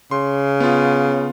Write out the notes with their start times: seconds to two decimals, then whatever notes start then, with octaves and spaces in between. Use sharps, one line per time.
0.11 C#3 C6
0.60 B3 F4